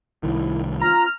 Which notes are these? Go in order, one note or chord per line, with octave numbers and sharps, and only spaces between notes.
C2 D#3 E4
F4 A#5 F6